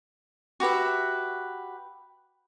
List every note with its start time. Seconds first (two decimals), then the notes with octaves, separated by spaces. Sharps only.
0.60 F#4 G4 B4 E5